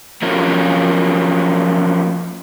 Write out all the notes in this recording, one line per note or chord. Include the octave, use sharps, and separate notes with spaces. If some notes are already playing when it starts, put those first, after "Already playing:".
F3 F#3 A#3 C#4 F4 A#4